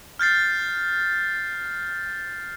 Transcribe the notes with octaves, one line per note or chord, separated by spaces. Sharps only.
F6 G6 A6 C7